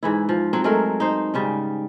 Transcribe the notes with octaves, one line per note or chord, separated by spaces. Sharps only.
G#2 E3 E4
F3
F#3 C4
F#3 G#3 A3 A#4
D#4 C5
G#2 C#3 G3